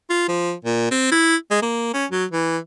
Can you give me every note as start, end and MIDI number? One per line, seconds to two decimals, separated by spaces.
0.10 0.26 65
0.28 0.53 53
0.65 0.89 46
0.91 1.10 60
1.12 1.36 64
1.51 1.60 56
1.62 1.92 58
1.94 2.05 61
2.11 2.25 54
2.32 2.58 52